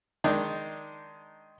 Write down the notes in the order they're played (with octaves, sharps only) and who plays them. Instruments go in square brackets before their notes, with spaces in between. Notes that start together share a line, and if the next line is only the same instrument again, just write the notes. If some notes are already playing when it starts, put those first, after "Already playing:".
[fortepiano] D#3 G#3 D4 D#4